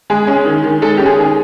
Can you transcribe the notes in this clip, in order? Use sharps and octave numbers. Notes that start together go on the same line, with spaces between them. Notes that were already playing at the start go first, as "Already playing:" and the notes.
G#3 G#4
C#4
D#3
D#3
G#3 A4
C#4 G4
G#4
D#3 G#4